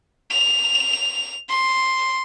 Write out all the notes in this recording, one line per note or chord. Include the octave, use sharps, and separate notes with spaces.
F7
C6